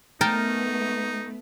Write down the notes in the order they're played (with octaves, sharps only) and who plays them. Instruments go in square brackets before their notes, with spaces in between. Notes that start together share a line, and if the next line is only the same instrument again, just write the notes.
[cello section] A3 B3 [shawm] D#4 [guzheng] A#4 G5 A5